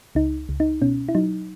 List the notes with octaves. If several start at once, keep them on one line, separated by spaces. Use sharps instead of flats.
C#2 D#4
C#2
D#4
B2 C#4
E4
F#3 D#4